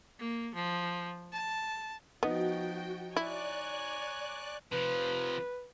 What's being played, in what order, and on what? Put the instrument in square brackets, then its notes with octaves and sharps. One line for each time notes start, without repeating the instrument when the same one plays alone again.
[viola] A#3
F3
A5
[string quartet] F3 [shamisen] B3 [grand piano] D#4 [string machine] F#4 G5
[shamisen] E4 [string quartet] C#5 G#5 A#5 [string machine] D5 F#6
[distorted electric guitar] C3 F3 [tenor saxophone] B4